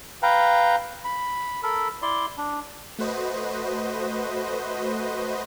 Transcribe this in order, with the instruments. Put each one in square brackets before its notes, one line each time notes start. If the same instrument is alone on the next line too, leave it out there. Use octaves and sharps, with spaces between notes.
[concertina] B4 F5 G5 A#5
B5
A4 A#4 B5
E4 D5 C6
D4
[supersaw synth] A3 F#4 B4 C5 D#5